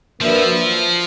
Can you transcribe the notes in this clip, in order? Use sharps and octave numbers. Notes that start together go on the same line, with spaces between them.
F3 A#3 D4 F#4 B4 E5